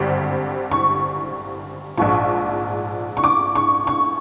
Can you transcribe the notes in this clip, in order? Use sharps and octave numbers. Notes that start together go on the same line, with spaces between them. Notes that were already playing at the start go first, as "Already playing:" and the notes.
Already playing: G#1 G2 D3 G3 C4
C#6
A#1 G#2 F3 C#6
C#6
D6
C#6
C#6